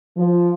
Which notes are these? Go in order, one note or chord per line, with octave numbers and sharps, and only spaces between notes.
F3